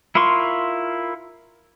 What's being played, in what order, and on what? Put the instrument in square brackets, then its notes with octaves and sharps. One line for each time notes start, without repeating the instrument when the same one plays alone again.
[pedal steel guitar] E4 F4 A#4 C6 C#6